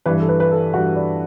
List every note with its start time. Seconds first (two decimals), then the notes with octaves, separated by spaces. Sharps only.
0.06 G2 E3 B4
0.20 A4
0.29 B4
0.40 B4
0.51 A4
0.74 G2 E3 F#4
0.96 D4